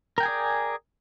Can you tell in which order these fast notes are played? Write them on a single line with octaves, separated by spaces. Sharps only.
A#4 G5 G#5 G#4 D5